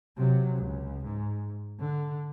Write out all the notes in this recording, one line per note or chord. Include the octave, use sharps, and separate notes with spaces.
C3 F#3
C#2
G#2
D3